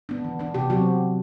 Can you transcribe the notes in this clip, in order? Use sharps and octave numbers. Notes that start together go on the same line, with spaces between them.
B3 D4
E3
B3 D4
C3 G4
F#3 C4 F#4